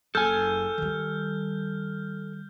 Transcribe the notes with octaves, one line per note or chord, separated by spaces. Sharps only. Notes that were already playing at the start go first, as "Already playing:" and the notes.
F#1 A4 G#5 F6 G6
D#3 G3